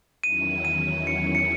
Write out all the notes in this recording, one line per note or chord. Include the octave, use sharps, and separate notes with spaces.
E2 D#3 F#3 C#4 E4 D#7
D#7
C#7
C#7